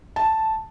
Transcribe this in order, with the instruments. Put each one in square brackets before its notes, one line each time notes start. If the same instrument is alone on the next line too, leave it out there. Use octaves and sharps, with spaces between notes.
[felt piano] A5